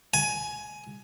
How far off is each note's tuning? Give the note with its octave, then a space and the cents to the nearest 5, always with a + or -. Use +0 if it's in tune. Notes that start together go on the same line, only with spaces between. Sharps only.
G#5 +15